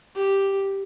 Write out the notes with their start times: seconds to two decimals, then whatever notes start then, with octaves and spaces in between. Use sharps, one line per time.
0.15 G4